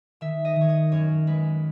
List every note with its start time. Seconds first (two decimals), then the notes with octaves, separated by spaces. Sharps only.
0.21 D#3 E5
0.45 D#5
0.56 D#3
0.61 C#5
0.69 D#5
0.92 F#2 C#5
1.27 G#3 B4